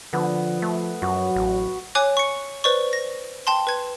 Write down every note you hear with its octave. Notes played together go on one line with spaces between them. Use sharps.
D3 F3 B3
A3
F#2 F#3 F#4
A1
C#5 G#5 D6 F#6
C#6 C#7
B4 C5 D5 C#6
A#6
G5 A5 C6
B4 G#6